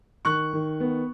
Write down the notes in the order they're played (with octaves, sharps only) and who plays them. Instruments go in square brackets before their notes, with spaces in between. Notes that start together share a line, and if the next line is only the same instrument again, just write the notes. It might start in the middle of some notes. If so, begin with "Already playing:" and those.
[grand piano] D#3 C#6 F#6
D#3
B3